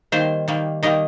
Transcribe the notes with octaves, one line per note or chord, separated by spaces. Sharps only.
D#3 G3 A#3 C5
D#3 G3 A#3
D#3 G3 A#3 D#5